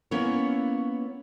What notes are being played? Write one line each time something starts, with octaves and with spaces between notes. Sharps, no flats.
A#3 B3 C#4 E4 C#5